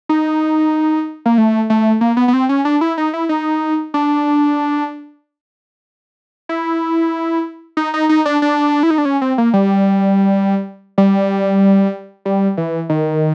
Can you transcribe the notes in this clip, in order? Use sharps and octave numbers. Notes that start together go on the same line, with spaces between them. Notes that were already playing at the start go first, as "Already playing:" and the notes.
D#4
A#3
A3
A3
A#3
B3
B3
C4
C#4
D4
E4
D#4
E4
D#4
D4
E4
D#4
D#4
D#4
D4
D4
E4
D#4
D4
C#4
C4
A#3
G3
G3
G3
E3
D#3